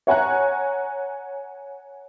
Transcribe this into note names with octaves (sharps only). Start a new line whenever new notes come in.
C#5 F#5 G#5 A#5 F#6